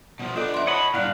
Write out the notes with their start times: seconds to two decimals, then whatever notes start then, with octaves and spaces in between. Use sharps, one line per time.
0.19 B2 F3
0.36 B3 D4 F4 A4 D#5
0.54 E5 C6
0.67 C#5 D#5 F#5 A5 B5
0.94 G2 A#2 E4 D5 F5 F#5